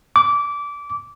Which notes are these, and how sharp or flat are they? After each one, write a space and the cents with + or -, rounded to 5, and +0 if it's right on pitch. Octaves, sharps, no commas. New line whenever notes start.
D6 -20